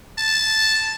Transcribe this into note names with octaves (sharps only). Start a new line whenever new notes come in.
A5